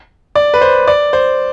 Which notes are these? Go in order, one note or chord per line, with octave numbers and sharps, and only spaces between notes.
D5
B4
C5
D5
C5